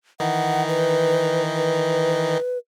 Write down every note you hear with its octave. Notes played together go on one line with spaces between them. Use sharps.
D#3 E3 D#4 F#5
B4
B4